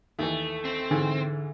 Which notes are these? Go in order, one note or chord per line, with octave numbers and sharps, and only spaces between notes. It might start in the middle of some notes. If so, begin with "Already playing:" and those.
D#2 E3 A3
C4
G#2 D3 E3